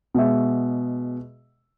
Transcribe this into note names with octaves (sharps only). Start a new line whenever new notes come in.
B2 G#3 E5